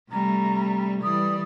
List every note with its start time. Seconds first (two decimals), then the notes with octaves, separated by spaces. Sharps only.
0.12 C3 G3 A3 A#5
1.03 E3 G3 D5 D#6